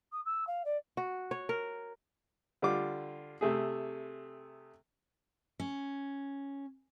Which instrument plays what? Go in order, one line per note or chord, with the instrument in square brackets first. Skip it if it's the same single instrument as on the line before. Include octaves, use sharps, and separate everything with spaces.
[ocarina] D#6
E6
F5
D5
[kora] F#4
C#5
A#4
[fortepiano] D3 G3 F4 D6
C3 A3 G#4
[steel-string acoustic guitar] C#4